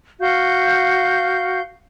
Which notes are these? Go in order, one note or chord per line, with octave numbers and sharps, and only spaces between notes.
F#4 F5 G6